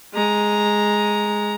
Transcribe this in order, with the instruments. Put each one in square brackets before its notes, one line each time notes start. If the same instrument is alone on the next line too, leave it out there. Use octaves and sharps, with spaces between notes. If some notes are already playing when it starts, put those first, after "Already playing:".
[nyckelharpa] G#3 A#5